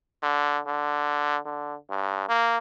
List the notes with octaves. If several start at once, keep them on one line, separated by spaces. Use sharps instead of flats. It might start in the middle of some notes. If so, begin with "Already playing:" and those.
D3
D3
D3
G2
A#3